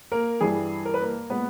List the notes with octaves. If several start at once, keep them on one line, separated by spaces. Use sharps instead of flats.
A#3 A#4
G2 E3 G3 G#4
A#4
B4
A#3 A#4
A#2 G#3 B3 B4